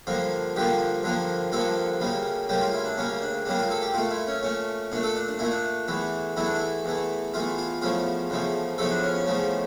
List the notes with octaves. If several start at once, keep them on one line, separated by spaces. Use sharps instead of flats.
G2 D3 F3 A#3
G2 D3 F3 A#3 G4
G2 D3 F3 A#3
G2 D3 F3 A#3 A4
D2 C#3 G3 A#3
D2 C#3 G3 A#3 G4
F4
E4
D4
D2 C#3 G3 A#3 C#4
D4
D2 C#3 G3 A#3 D4
F4
A4
G4
A#2 A3 F4
E4
C#4
A#2 A3 C#4
A#2 A3 D4
A4
D4
D4
A#2 A3 E4
D4
E2 E3 A3
E2 E3 A3 E4
D4
E4
E2 E3 A3
E2 E3 A3 F4
F4
E2 C#3 F3 A3 F4
E2 C#3 F3 A3
E2 C#3 F3 A3 A4
D4
C#4
C#4
E2 C#3 F3 A3